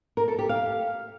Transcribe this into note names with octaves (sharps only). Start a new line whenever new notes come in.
A#4
A4
G4
F5